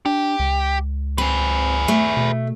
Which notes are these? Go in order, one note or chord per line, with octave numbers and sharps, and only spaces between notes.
D4 G4
C#2
C4 G#4 B4
A3
B2